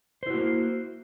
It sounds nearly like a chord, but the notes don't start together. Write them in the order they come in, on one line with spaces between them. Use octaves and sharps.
C5 E4 F#4 A#3